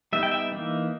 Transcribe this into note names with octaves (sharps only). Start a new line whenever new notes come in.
G3 B3 D#4 E5
G5
E5
E3 A#3 D#4